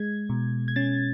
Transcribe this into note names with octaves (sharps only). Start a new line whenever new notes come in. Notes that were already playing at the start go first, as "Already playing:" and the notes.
Already playing: G#3 G#6
B2
G#6
C#4 A6